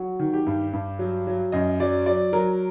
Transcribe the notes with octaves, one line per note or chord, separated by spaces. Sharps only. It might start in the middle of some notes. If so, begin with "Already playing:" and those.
Already playing: F#3 F#4
D#3
G4
G2
G2
F#3
F#3
F#2 D#5
F#3 D5
F#3 D5
F#3 A#4